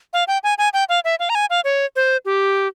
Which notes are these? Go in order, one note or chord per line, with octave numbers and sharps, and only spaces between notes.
F5
G5
G#5
G#5
G5
F5
E5
F5
A#5
G#5
F5
C#5
C5
G4